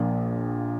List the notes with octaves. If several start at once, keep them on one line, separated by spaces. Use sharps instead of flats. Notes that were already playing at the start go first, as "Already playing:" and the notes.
Already playing: A#1 A#2